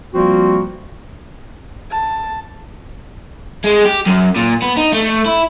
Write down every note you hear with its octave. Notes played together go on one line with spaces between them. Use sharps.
F3 G3 A#3 C4 F4 F#4
A5
G#3
G4
F#2
A#2
B3
D#4
A3
E4